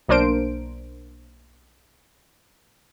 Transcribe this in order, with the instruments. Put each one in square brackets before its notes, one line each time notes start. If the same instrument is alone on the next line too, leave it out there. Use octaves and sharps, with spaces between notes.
[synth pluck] B1 A#3 D4 A#4 C5 D7